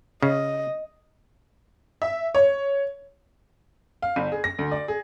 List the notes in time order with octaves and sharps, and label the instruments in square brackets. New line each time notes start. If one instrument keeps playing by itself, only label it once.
[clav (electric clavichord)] C#3 [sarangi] D#5
[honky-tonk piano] E5
C#5
[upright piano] F5
G1
G#4
A#6
D2
D5
G#4